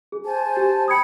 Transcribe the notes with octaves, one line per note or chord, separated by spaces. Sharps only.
G#4
C5 G#5 A5
G4
G5 B5 D#6 G#6 C#7